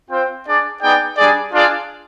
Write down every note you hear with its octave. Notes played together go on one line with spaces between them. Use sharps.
C4 F4 C5 G5
D4 G#4 D5
B3 D#4 G#4 D5 G5
G3 D4 G#4 D5
D4 F4 G#4 D5